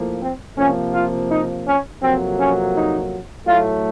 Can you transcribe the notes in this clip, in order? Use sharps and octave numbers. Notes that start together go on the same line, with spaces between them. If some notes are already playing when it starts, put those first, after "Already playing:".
Already playing: A2 F3 A#3
C4
C3 F3 A#3 C#4
F4
D#4
C#4
F2 C3 F#3 A#3 C4
C#4
D#4
A2 F#3 A3 F4